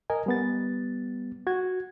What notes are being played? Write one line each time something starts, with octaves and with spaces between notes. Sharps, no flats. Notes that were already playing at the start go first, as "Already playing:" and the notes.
A#4 D#5 G#5
G3 B3 A6
F#4 G#6